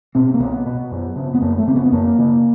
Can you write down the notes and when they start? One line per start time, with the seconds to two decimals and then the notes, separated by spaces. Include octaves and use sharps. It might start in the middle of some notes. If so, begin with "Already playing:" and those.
0.15 B2 C4
0.34 A#3
0.40 C2 B3
0.66 B2
0.91 F#2
1.16 C#3
1.34 B3
1.41 F#2 A#3
1.58 A3
1.67 C#3 C4
1.76 B3
1.86 B3
1.92 F#2 A#3
2.18 C#3